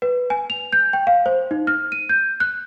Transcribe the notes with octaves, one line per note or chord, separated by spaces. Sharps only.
B4
G#5
F7
G6
G5
F5
C5
D#4
F6
D#7
G6
F#6